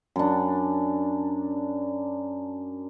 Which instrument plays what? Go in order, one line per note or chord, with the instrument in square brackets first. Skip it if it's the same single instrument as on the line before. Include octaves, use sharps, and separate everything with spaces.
[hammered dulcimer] F#2 D4